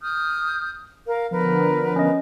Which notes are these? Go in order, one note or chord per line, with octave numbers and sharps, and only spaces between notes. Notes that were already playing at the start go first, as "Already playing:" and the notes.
D#6 F6 G6
A#4 F5
D3 F3 B3 A#4 B4
C#4 D#5